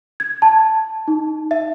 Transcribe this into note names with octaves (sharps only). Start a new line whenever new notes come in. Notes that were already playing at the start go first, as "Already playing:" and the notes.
G#6
A5
D#4
E5